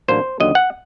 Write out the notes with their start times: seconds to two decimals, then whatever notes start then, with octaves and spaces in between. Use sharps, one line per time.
0.08 A1 A2 F#3 A#3 D4 C5
0.40 D#2 D3 F#3 D#5
0.55 F#5